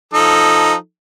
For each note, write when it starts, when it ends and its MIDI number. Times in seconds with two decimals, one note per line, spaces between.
0.14 0.74 53
0.14 0.74 63
0.14 0.74 69